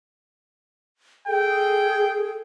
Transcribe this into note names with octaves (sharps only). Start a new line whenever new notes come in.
G#4 A4 G5